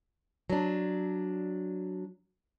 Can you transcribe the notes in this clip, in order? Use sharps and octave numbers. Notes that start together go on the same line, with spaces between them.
F#3 D4